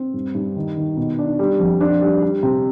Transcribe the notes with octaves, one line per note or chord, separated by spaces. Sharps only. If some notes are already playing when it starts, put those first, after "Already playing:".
Already playing: C4
G2
G2
D#3
D#3
B2
D4
G3
F2
D4
G3
G3
C3